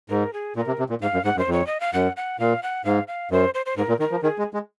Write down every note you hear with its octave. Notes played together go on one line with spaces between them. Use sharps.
G#2 A#4
G#4
A#2 A#4
C3
C3
A#2
G#2 F5
F#2
G#2 F#5
F#2
C5
F2
C#5
D#5
F5
F#2 F#5
F#5
A#2 F5
F#5
G#2 F5
F5
F#2 C5
C5
C5
G#2 A#4
A#2
D#3 A#4
F3
D#3 G#4
G#3
G#3